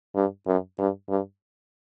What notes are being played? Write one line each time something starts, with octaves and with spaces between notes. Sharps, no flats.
G2
F#2
G2
G2